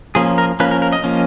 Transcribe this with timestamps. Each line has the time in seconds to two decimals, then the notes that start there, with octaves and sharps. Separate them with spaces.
0.15 F3 A#3 C#4 G#4
0.38 A#4
0.60 F3 A#3 C#4 B4
0.71 A#4
0.82 A#4
0.92 D#5
1.04 F3 A#3 C#4